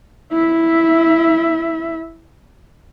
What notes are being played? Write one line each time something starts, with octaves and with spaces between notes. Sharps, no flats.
E4 E5